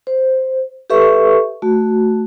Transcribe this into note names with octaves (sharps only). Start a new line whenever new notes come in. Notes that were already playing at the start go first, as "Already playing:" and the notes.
C5
G4 A4 B4 E5 C#6
A3 F#4